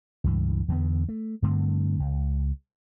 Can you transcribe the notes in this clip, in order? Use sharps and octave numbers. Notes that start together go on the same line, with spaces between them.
C#2 G2 E3
E2 D3 B3
A3
G2 D3 A3 C4
C#2